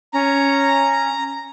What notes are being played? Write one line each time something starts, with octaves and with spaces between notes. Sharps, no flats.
C#4 A#5